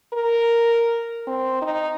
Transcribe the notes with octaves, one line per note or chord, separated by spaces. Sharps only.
A#4
C4
D#4